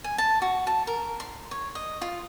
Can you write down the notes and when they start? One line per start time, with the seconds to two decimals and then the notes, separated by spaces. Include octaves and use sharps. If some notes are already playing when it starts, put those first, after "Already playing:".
0.04 G#5
0.18 A5
0.42 F#4
0.67 A5
0.87 A#4
1.20 C6
1.51 C#5
1.75 D#5
2.02 F4